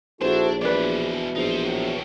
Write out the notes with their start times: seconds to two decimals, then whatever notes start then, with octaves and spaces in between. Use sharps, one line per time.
0.21 A#1 D4 E4 F#4 A4 C5 A5
0.61 B2 E3 G#3 D4 B4 D5
1.36 A#1 D#4 C5
1.63 A2 F#3